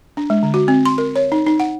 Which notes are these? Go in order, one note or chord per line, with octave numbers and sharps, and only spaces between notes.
D4
G#3
D3
F#4
C4
C6
A#4
C#5
D#4
D#4
F#5